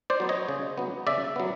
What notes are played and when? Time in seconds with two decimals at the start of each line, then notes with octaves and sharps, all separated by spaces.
0.10 C5 D5
0.20 F#3 B3
0.29 C#5 D#5
0.48 C#3
0.78 F#3 B3
1.07 C#3 D5 E5
1.36 F#3 B3